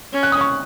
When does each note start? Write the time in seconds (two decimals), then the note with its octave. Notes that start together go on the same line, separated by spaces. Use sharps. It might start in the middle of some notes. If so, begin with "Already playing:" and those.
0.13 C#4
0.23 F#6
0.32 D#6
0.41 C#6